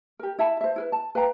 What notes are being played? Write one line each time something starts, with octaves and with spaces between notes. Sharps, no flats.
G4 A#4
E4 E5 A5 B5
C5 E5
E4 A#4 B4
A5
B4 F5 G5 A#5